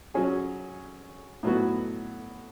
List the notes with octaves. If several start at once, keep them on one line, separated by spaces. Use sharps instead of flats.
F#3 C#4 G#4
A2 F#3 B3 F#4